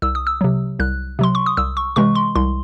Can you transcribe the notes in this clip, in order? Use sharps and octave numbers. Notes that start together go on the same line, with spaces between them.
C2 E6
D#6
E6
C3 F#3
C2 F#6
C3 F#3 C6
C#6
D#6
C2 E6
C#6
C3 E3 G#3 C#6
C6
C2 C6